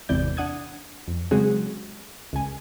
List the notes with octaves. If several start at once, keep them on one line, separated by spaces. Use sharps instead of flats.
G#1 E2 C3 E3 D5 G6
D4 F#5 D#6 G#6
F2
C#3 F#3 G#3 C4 F#4 G#4
C#2 G#5